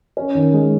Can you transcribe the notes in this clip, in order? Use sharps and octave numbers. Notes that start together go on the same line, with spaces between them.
C#4
D#3
G#3